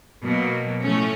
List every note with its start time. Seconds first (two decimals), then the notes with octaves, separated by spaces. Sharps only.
0.22 B2 F#3 A#3
0.83 A2 F3 A3 C#4